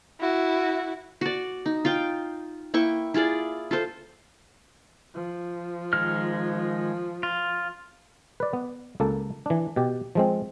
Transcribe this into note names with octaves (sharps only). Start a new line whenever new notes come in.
E4 F#4
F#4 D5
D#4
F4 F5 G5
A#3 E4 G5 C#6
E4 F4 G#4 D5
F4 A4 C5
F3
D#3 G#3 F6
F4
B4 D5
B3
C#2 A#3 A4
E3 D4
B2 G4
F3 G#3 C4